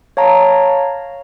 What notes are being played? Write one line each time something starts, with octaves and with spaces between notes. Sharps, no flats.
C#5 F5 A5 A#5